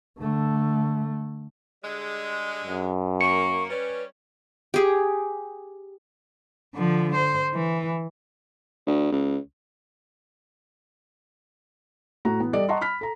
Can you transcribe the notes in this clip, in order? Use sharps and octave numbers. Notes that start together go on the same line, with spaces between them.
D3 A3
D3 G3 G#3
F#2
A#3 C#6 C#7
G3 C#4 B4
G4 G#4
D3 F3
C5
E3
D2
C#2
A2 F#4 A#5
E3 B3
G3 A4 D5 D#5
D#5 F#5 A5 A#5 C6 C#6
B5 F6 B6
A4 A#5